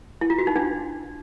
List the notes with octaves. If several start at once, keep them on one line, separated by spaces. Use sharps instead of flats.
E4
F4
F#4
D#4
D4